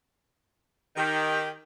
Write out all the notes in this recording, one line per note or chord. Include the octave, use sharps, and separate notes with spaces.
D#3 G4